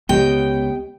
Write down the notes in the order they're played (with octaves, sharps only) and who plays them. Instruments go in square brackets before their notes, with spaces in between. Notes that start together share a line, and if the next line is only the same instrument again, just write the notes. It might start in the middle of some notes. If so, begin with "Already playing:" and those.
[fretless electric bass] C#2 [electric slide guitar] B3 C#5 D#5 [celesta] G4 [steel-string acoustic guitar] G5